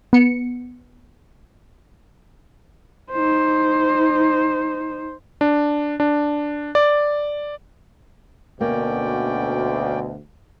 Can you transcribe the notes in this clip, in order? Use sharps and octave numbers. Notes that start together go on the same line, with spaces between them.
B3 C#7
D#4 C5
D4
D4
D5
D2 B2 A#3 C#4 D5 G5